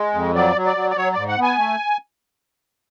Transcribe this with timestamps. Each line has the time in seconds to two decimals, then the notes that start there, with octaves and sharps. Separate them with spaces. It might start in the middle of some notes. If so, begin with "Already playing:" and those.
Already playing: G#3
0.14 F2
0.35 F#3 D5
0.56 F#3
0.66 D5
0.76 F#3
0.91 D5
0.96 F#3 C#5
1.13 G#2 D5
1.29 F#5
1.38 B3 G#5
1.58 A3